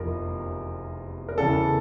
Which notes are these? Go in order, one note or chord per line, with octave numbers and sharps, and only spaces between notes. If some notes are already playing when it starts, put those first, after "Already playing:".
Already playing: F1 E2 C3 F3 A#4
A#4
E2 C#3 E3 A4